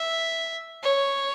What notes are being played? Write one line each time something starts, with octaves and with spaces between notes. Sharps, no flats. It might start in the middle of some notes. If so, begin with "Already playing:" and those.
Already playing: E5
C#5